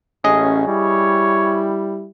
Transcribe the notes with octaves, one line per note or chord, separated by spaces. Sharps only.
A1 C#4 G#4 D#5
G3 E4 C#5